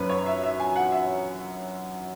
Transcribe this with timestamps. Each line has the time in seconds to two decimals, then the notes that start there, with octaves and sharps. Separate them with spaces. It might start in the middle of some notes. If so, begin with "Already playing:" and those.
Already playing: F#2 F#3 C#4 B4
0.10 C#5
0.26 E5
0.43 E5
0.60 G#5
0.76 F#5
0.92 E5